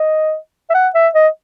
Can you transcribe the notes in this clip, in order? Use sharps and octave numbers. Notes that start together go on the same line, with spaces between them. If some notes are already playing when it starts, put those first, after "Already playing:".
Already playing: D#5
E5
F#5
E5
D#5